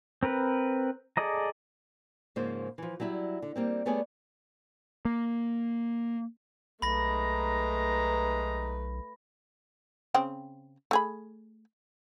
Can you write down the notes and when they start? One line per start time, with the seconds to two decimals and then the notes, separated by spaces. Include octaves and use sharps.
0.23 C4 A#4 B4
1.17 G#4 A4 D5 D#5 A#5
2.36 G#2 C#3 F3 A#3 C5
2.78 E3 F3
3.00 F#3 G3 E4 E5
3.42 D3
3.56 G3 A#3 C4
3.86 G3 A3 B3 G#4 C#5 D5
5.05 A#3
6.82 B1 G#3 A3 D#4 B4 A#5 B5 A#6
10.14 C#3 C4 G5
10.91 A3 G#4 B5